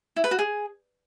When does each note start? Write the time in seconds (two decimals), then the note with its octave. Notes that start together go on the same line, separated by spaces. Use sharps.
0.16 E4
0.24 B4
0.31 F#4
0.39 G#4